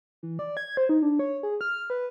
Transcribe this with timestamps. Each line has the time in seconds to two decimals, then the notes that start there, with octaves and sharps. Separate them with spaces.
0.23 E3
0.39 D5
0.57 G#6
0.77 C5
0.89 D#4
1.02 D4
1.19 C#5
1.43 G#4
1.61 F6
1.90 B4